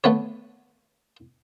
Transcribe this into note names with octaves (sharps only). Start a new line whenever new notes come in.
A3 B3 B4 C#5